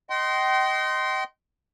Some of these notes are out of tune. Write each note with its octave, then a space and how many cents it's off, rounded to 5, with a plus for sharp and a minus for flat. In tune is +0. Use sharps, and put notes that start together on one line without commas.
D#5 +0 G5 -40 C6 +0